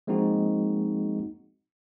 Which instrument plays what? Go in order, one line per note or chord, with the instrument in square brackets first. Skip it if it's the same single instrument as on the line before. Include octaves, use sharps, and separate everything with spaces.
[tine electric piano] F3 G#3 A#3 C4 D#4 F#4